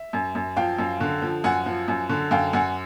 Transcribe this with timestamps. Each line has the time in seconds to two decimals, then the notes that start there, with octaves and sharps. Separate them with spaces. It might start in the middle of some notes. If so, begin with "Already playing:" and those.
Already playing: E5
0.13 F#2
0.35 F#2
0.56 F3 F5 G5
0.78 F#2
1.01 D3
1.22 F3
1.44 F#2 F#5 G#5
1.66 F3
1.88 F#2
2.09 D3
2.31 F#2 F5 G5
2.53 F#2 F#5 G#5